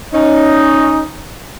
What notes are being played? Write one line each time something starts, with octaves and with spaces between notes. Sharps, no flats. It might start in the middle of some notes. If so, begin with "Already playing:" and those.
C#4 D#4